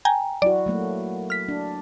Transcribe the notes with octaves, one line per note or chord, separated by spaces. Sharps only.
G5 G#5 A#5
F#3 E4 F#4 D5
F#3 A3 A#3
F6 B6
D4